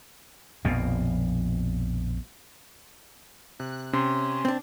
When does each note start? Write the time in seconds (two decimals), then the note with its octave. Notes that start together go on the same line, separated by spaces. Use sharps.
0.65 A#1 F2 B2
3.60 C3 F#6
3.93 C3 C#4 C6
4.45 C4 D4